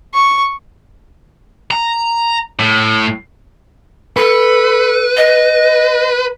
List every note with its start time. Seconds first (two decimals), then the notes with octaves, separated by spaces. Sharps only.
0.14 C#6
1.71 A#5
2.60 A2
4.17 A4 B4
5.17 D#5